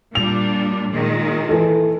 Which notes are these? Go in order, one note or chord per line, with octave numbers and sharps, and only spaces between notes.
A#2 G3 D4 F7
A#2 D#3 G#3
E3 A4